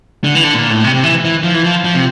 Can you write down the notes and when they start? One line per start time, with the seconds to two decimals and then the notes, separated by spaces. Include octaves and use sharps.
0.24 D3
0.35 E3
0.44 D3
0.54 A#2
0.69 A2
0.84 C3
0.94 C3
1.03 E3
1.25 E3
1.43 F3
1.54 E3
1.64 F3
1.84 F3
1.94 C3